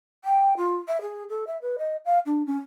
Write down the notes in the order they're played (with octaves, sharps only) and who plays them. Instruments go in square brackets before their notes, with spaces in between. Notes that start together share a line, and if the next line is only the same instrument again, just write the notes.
[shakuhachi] G5
F4
E5
G#4
A4
E5
B4
D#5
F5
D4
C#4